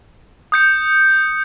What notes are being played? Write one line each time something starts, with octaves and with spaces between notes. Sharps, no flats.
D#6 G6 C#7